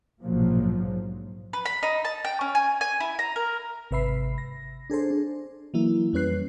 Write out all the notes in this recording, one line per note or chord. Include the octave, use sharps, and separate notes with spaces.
A#1 G#2 B2 F3 F#3 A#3
B4
B5
D#4
A5
G5
C#4
G#5
G#5
E4
A#5
A#4
G#1 C3 B4 E5 B5 C7
A#6
D4 G#4 A4 C5
D4
E3 F#3 A#3 E4
F2 G3 C#4 B4 F#6 C7